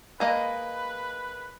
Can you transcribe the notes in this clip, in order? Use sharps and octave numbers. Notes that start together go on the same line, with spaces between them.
G#3 A#3 B4 D#5